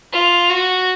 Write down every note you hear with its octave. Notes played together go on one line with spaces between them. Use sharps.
F4
F#4